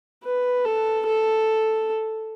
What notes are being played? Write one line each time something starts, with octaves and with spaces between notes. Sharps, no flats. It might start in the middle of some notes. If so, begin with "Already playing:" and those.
B4
A4
A4